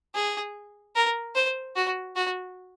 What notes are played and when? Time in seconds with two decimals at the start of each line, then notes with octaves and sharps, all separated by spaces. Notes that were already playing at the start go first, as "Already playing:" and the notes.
0.14 G#4
0.95 A#4
1.35 C5
1.76 F#4
2.16 F#4